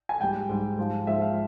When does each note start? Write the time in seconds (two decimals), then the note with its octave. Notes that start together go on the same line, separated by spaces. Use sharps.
0.09 G#5
0.20 G#2 G3 G5
0.49 G#2 G3
0.78 G#2 F3
1.07 G#2 F3 E5
1.21 F5